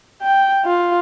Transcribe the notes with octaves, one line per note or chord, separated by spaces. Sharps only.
G5
F4